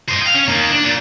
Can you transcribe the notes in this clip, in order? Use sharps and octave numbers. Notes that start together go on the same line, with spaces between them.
C5 D#5
F5 G5
C#4
A#3 D#4
D4
A#2